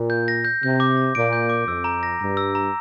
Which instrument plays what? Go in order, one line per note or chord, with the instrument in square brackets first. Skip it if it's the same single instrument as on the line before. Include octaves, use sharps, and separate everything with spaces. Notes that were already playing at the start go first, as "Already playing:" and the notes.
Already playing: [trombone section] A#2
[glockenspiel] G6
A#6
G6
[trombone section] C3 [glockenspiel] G6
[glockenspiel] D6
A#6
[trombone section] A#2 [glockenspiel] D7
[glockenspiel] G6
D6
[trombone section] F2 [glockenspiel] E6
[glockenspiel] A#5
A#6
[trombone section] G2 [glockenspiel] A#5
[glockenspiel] E6
A#5